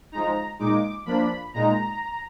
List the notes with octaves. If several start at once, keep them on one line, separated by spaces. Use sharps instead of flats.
F3 G#3 D#4 A#5
A#2 G#3 D#4 D6
F3 A#3 D4 B5
A#2 G#3 D#4 A#5